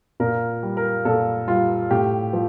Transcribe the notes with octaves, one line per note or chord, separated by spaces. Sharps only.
A#2 A#4
G3
A#4
A#2 A4
G3 F4
A2 G4
F3